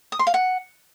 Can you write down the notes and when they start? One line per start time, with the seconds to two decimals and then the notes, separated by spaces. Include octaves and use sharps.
0.12 D#6
0.19 C6
0.27 F5
0.34 F#5